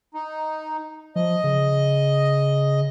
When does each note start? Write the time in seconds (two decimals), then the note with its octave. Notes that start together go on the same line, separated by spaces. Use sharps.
0.14 D#4
1.16 F3 D#5
1.44 C#3